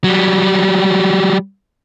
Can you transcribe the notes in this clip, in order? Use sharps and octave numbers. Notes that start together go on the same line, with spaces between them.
F#3 G3